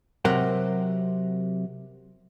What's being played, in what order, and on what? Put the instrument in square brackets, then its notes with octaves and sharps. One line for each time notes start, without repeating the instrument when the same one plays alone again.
[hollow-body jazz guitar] C3 F#3 A#4 F#5 G5